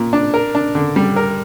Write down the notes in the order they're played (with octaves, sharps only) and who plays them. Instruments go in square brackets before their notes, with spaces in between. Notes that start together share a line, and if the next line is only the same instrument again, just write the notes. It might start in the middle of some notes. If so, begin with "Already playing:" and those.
Already playing: [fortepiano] A#2
D4
A#4
D4
D3
G3
A#4